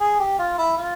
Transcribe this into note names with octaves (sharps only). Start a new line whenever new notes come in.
G#4
G4
F4
E4
F4